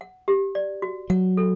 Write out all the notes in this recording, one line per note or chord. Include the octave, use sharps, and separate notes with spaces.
F#5
G4
D5
F#4
F#3 F#5
A4